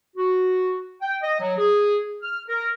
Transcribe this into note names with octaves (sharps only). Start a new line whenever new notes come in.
F#4
G5
D#5
F#3
G#4
F6
A#4